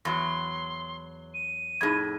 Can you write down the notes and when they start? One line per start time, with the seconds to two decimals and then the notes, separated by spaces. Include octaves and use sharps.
0.05 E2 F#3 C6
1.34 D#7
1.81 F2 A2 D#4 G#4 G#6